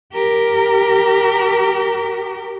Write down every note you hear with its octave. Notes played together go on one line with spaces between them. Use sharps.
G4 A#4